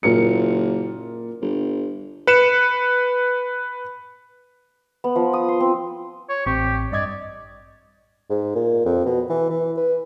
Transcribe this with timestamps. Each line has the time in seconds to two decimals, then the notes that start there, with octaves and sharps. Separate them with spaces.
0.03 F#1 A#2 A#4 C#7
1.42 G1
2.27 B4 C#7 E7
5.04 B3
5.16 F3
5.33 D#6
5.48 C6
5.60 C4
6.29 C#5
6.46 A1 C4 G4 C#6
6.92 G2 D5 D#5 G#6
8.29 G#2
8.55 A#2
8.85 F2
9.06 B2
9.30 E3
9.50 E3
9.77 B4